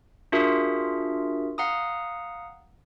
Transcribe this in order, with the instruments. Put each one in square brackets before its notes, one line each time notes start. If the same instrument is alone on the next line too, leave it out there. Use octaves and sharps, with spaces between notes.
[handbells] D4 F4 F#4 G#4 A#4 E5
F5 F#5 A#5 D#6